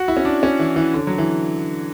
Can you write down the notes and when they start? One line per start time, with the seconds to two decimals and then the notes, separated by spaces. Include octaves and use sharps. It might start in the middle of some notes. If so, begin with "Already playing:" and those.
Already playing: F#4
0.08 E4
0.17 C#4
0.25 D4
0.43 C#4
0.59 E3
0.76 E3
0.93 D3
1.07 F#3
1.18 E3